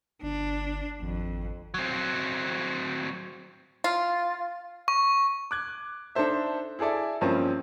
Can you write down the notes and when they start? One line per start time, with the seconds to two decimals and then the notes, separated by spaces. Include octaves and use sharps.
0.23 G1 D4
1.02 G#1 F2
1.74 F#3 C4
3.84 F4
4.88 C#6
5.51 D6 F#6 G#6
6.15 D4 D#4 A4 C5 E5
6.79 E4 G#4 A4 D5 E5
7.21 G2 F3 A#3 C4 C#4